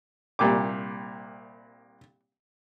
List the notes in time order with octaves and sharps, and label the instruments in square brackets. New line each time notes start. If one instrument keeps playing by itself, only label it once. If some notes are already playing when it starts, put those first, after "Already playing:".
[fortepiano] C2 A#2 G4 D6